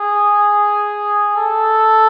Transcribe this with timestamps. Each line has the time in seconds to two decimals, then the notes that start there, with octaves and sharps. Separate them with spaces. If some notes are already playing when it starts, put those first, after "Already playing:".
Already playing: G#4
1.37 A4